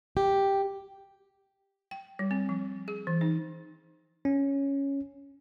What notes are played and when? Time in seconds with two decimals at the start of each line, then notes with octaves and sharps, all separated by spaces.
0.17 G4
1.91 G5
2.19 G3
2.31 C4
2.49 F3
2.88 G#4
3.07 E3
3.21 D#4
4.25 C#4